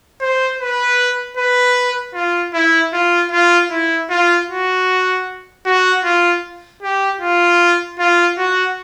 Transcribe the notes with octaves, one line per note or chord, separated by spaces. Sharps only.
C5
B4
B4
F4
E4
F4
F4
E4
F4
F#4
F#4
F4
G4
F4
F4
F#4